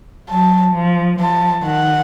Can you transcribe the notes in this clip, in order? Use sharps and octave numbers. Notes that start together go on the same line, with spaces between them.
F#3 A5
F3
F3 A5
D#3 F#5